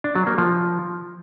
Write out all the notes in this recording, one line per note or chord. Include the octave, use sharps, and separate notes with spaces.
D4
F#3
A#3
F3